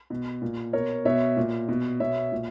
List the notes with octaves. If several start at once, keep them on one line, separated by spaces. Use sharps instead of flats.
B2
A#2
B2 A#4 C#5
B2 C#5 E5
A#2
B2
B2 C#5 E5
A#2